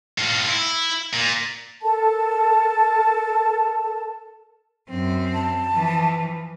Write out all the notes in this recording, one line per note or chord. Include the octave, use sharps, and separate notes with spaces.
A2 F4
E4
A#2
A4 A#4 A5
F#2 C4
A5
E3 F3